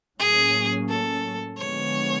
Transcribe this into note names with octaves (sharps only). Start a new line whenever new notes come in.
A2 F#3 A#3 C#4 G#4
A4
D3 F3 G#3 B3 C#5